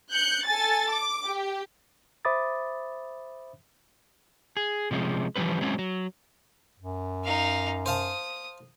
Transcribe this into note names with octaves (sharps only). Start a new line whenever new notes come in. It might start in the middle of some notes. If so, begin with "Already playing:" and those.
F#6 G6 C#7
A4 G#5 A6
D6
G4
C5 E5 B5 D6 D#6 A6
G#4
C3 F3 G#3 C#4
E3 F3 G3 C#4 B4
F#3 G#3 C4 C#4
F#3
F#2
D#4 F5
C5 F5 A5 D#6